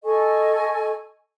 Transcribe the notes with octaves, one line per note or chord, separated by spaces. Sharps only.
A4 D#5 G#5 C#6